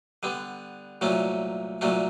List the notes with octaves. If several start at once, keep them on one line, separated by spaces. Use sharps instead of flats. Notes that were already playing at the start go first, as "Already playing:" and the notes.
D3 G3 B3
C2 A#2 F#3 A3 C#4
C2 A#2 F#3 A3 C#4